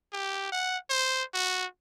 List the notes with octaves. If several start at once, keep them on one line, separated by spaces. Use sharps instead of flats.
G4
F#5
C5
F#4